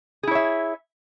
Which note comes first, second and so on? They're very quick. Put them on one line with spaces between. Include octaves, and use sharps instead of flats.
G#4 E4 C#5 E5